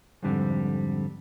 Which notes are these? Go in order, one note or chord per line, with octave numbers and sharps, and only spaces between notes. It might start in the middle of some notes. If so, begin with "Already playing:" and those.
F2 G#2 D3 G3 C4